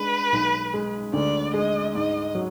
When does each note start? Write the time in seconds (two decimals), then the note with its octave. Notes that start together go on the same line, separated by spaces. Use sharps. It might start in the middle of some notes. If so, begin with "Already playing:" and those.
Already playing: G#3 D4 B4
0.32 B1
0.74 G#3
1.13 D2 D5
1.54 G#3 D#5
1.95 G#2 D#5
2.35 F#3